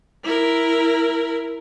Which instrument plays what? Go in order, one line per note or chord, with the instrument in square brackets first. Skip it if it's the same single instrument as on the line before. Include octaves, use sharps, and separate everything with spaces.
[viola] E4 A#4